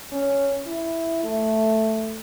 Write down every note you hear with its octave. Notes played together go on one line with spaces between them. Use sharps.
C#4
E4
A3